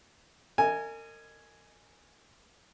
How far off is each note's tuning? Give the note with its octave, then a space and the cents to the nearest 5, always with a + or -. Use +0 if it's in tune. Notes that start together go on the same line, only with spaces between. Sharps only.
A#4 -40 D#5 -20 G#5 +0